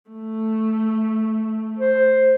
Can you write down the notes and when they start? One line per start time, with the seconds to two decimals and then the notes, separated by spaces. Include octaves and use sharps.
0.11 A3
1.79 C5